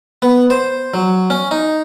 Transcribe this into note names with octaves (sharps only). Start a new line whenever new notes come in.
B3
C5
F#3
C#4
D#4